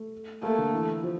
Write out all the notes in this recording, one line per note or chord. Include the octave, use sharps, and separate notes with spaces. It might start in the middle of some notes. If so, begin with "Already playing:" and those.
Already playing: A3
A3 A#3
D3
E3
F3